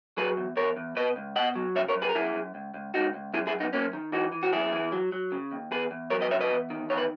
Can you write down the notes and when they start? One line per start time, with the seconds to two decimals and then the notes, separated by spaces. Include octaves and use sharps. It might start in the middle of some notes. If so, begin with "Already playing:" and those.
0.17 F#3 G#4 B4
0.37 E2
0.56 E2 A#4 C#5
0.77 E2
0.96 B2 B4 D#5
1.16 C#2
1.36 B2 D#5 F#5
1.56 F#3
1.75 C#3 C#5 E5
1.88 A#4 C#5
1.95 F#2
2.02 G#4 B4
2.09 A#4
2.15 F#2 E4 G#4
2.35 F#2
2.55 C#2
2.74 C#2
2.94 C#2 D#4 F#4
3.14 C#2
3.34 F#2 E4 G#4
3.47 E4 G#4
3.53 F#2
3.60 B3 D#4
3.73 F#2 A#3 C#4
3.93 D#3
4.12 E3 D#4 F#4
4.32 E3
4.43 F#4
4.53 F#2 E4 G#4
4.72 E3
4.92 F#3
5.12 F#3
5.32 C#3
5.51 D#2
5.71 E2 G#4 B4
5.91 E2
6.10 F#3 A#4 C#5
6.21 B4 D#5
6.30 C#3 C#5 E5
6.41 B4 D#5
6.50 E2
6.70 D#3
6.90 E2 C#5
6.97 B4